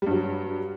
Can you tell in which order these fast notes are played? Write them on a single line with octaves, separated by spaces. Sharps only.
G3 G2 F#3